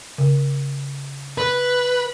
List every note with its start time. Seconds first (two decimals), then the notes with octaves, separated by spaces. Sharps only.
0.18 C#3
1.38 B4